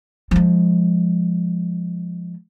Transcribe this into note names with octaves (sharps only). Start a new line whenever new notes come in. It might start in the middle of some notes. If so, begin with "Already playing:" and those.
F3 G#3